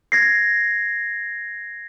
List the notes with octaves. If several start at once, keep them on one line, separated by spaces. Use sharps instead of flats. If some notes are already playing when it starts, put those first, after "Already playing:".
G#6 A#6 C7